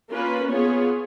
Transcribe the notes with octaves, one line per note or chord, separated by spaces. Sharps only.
A#3 C#4 F4 B4
B3 F4 G#4 C#5